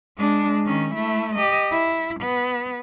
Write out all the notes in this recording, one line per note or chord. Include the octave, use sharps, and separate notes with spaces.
G#3 D4
D#3 C#4
A3 E4
G4 D#5
E4
B3